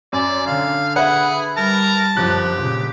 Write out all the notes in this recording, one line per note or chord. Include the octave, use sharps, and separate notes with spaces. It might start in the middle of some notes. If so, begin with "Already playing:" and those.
F#2 D5 G#5
D3 F5
G#4 B4 E5 F#5
G3 A#4 A5
G1 F#2 F3 G4 F#6
A#2 C#3